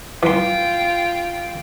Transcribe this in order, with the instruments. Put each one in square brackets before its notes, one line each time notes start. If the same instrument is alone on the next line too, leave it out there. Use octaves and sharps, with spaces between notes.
[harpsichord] E3 C6 [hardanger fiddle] F4 G5